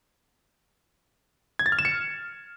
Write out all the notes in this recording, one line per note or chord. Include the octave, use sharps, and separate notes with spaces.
G#6
A6
F6
E7
C#7